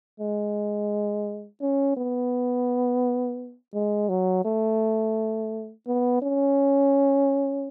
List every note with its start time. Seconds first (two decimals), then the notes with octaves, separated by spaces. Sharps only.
0.20 G#3
1.61 C#4
1.97 B3
3.74 G#3
4.09 F#3
4.45 A3
5.87 B3
6.22 C#4